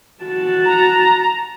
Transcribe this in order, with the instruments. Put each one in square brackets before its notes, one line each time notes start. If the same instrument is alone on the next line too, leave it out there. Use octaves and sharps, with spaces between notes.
[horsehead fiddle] F#4 A5
[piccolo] A#5